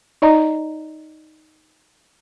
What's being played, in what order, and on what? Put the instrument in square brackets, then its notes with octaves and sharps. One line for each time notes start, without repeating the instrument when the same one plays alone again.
[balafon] D#4 D5 D#5 A#5